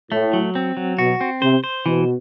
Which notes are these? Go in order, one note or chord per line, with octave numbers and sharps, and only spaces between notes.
A2 A3
F#3
C4
F#3
B2 F#4
C4
C3 C5
C5
B2 E3